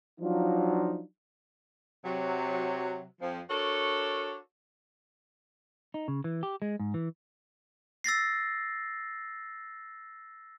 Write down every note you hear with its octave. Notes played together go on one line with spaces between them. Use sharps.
F3 F#3 D4 D#4 F4
C3 F#3
F2 F3
D4 F#4 A4 A#4 C#5
D#4
C#3
E3
G4
G#3
G#2
E3
E6 A6 A#6 C7